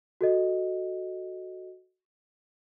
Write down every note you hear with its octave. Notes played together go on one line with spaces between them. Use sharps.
F#4 A4 D#5